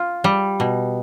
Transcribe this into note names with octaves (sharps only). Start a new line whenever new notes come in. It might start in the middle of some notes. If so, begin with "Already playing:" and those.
Already playing: F4
G3
B2